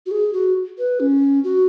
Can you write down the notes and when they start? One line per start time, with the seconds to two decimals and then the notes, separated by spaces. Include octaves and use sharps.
0.06 F#4
0.11 G#4
0.33 F#4
0.78 B4
1.00 C#4
1.44 F#4